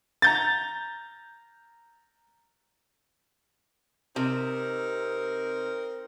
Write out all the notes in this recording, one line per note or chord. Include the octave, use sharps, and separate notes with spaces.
A#5 G6 A6
C3 C4 D#4 A#4